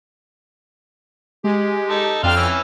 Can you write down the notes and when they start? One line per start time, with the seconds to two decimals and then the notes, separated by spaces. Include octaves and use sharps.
1.44 G#3 G4
1.90 D#4 A4
2.23 F2 C4 D4 F5 G5 C6 F6
2.36 E3 C#4 E6